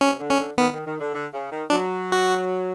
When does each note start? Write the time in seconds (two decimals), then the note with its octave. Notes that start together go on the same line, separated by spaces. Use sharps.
0.01 C3 C#4
0.20 D3
0.29 C#4
0.39 D3
0.57 D#3 B3
0.72 D#3
0.86 D#3
0.99 D3
1.13 D3
1.33 C#3
1.51 D#3
1.70 F#3 D4
2.12 F#4